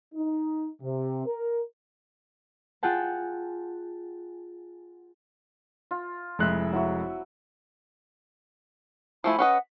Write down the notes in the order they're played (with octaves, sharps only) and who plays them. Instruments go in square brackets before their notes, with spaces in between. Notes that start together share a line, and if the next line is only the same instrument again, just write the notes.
[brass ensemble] D#4
C3
A#4
[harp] F4 G#4 F#5 G5 A5
[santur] F4
[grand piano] F1 G#3 F#6 [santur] E4 E5
[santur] F#3 E4 F#4
[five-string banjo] F3 A3 E4 [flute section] G#5 B5
[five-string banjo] C#4 B4 D#5 [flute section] F#5